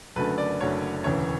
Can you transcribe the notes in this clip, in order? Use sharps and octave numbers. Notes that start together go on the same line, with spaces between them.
F#1 F#2 D3 A3 B4
D5
F#1 F#2 D3 A3 C#5
E1 D2 C#3 E3 C#5